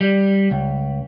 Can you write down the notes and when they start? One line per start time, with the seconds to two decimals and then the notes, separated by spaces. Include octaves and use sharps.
0.01 G3
0.51 C#2